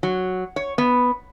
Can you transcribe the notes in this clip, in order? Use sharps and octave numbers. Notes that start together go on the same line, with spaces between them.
F#3
C#5
B3